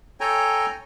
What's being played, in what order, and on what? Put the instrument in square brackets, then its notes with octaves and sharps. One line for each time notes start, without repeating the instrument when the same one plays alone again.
[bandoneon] A4 C#5 G5 G#5 A#5